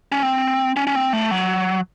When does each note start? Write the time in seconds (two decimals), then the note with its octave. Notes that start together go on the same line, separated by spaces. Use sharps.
0.12 C#4
0.23 C4
0.77 C#4
0.87 C#4
0.96 C4
1.13 A3
1.31 F#3